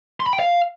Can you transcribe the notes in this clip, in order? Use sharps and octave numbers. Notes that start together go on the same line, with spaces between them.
C6
B5
G5
F5